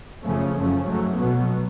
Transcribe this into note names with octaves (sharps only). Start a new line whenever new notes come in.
F#2 C#3 F3 A3 C#4
F#2 F3 A3 C#4
G#2 F#3 A3
B2 F#3 B3